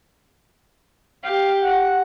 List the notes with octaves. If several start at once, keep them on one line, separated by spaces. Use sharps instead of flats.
G4 F5
F#5